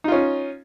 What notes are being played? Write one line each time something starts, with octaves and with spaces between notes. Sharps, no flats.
C#4 D#4 F4